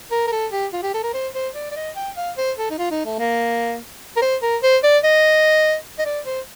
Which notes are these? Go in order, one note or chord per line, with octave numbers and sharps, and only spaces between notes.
A#4
A#4
A4
G4
F4
G4
A4
A#4
C5
C5
D5
D5
D#5
G5
F5
C5
A4
D#4
F4
D#4
A3
A#3
A#4
C5
A#4
C5
D5
D#5
D#5
D5
C5